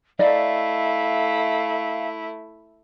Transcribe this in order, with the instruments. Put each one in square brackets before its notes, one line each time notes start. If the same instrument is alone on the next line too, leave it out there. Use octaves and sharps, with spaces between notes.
[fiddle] A3 E4 [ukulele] D5 D#5 A#5 [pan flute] F5